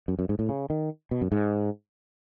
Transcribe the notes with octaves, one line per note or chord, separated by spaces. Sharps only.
F#2
F#2
G#2
A2
C#3
D#3
B2
F#2
G#2